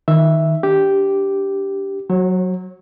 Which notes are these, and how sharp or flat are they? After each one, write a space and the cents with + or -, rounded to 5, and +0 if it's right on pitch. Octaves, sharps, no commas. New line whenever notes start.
D#3 +5 E5 +0
D4 -15 G4 -5
F#3 +0 C#5 -40